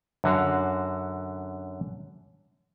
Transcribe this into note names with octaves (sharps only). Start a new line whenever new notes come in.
F#2 D3 F#4 F5